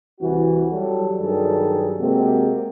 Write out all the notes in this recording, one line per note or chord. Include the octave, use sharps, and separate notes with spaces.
C2 C3 E3 F#4
F#3 G3 A4
G2 D#3 F#3 G3 G#4 A4
C3 G#3 A#3 C4 F#4 G4